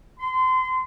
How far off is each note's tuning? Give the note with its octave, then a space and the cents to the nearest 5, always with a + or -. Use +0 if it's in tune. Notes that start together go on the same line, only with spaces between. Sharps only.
C6 -30